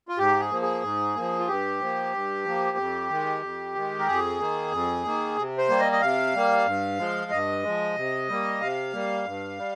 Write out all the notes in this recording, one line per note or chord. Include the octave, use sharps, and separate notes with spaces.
F4
G#2 G4
G#4
F3 A#3
G#4
G#2
F3 A#3
F4
G2 G4
F3 A#3
G2
F3 A#3
F2
D#3 G#3
F2
D#3 G#3
A#4
F2 G#4
D#3 A#3
F2
D#3 A#3
C3
C5
G3 A#3
D#5
D#5
C3 F5
G3 A#3
G2
F3 G#3
G2 D#5
F3 G#3
C3
G3 A#3
C3 F5
G3 A#3
G2
G3